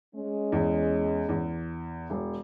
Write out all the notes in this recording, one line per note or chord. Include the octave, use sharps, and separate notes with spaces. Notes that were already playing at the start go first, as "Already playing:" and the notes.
G#3 C#4
E2
E2
E1